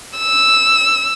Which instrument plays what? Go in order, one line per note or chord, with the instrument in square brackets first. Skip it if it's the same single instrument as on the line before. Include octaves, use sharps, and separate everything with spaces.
[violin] E6